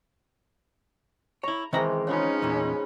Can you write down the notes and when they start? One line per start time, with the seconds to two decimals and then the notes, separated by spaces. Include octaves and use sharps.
1.43 E4 C#5 A#5
1.73 C3 D#3 E3 G#3 A#4 A#5
2.07 C#3 C#4 D#4 F4 B4
2.42 E2 A#2